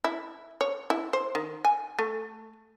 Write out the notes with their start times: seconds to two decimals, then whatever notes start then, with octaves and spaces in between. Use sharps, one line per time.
0.04 E4
0.61 C#5
0.90 E4
1.13 C5
1.35 D#3
1.65 G#5
1.99 A3